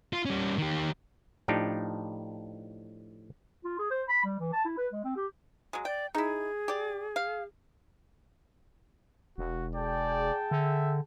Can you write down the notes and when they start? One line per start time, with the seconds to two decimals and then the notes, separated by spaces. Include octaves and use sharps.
0.13 F4
0.25 G3 C#4
0.58 D#3 G4
1.48 A2 F3 D4 D#4 G4
3.64 F4
3.79 G#4
3.90 C5
4.09 B5
4.24 G3
4.40 E3
4.53 A5
4.65 E4
4.77 B4
4.93 G#3
5.04 C4
5.16 G4
5.73 F#3 G#3
5.85 D5 G5
6.15 D#4 E4 G#4
6.68 G4 D5
7.16 F5
9.38 E1 F#4
9.75 G#4 D5 G5 A5
10.51 D3 E5